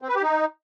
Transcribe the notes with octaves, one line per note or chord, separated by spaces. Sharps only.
C4
B4
G4
D#4